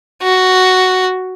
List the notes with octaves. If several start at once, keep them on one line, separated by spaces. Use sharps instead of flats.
F#4